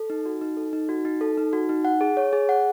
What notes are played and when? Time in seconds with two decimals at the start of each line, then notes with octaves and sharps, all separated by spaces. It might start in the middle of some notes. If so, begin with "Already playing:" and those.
Already playing: A4
0.10 D#4
0.26 F#4
0.41 D#4
0.57 A4
0.73 D#4
0.89 F#4
1.05 D#4
1.21 A4
1.38 D#4
1.53 F#4
1.69 D#4
1.85 F#5
2.01 G#4
2.17 C#5
2.33 G#4
2.49 F#5